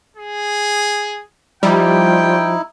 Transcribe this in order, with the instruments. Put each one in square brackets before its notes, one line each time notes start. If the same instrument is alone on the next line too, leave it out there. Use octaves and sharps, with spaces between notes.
[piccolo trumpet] G#4
[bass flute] F3 [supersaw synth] G3 [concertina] D#4 E4 [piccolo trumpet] G5